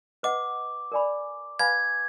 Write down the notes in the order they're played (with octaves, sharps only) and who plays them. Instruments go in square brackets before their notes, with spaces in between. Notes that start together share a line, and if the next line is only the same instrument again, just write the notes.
[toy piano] B4 D#5 F#5 [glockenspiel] D6
[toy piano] A#4 D5 G#5 B5
[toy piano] B4 F5 G#5 B5 [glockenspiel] G#6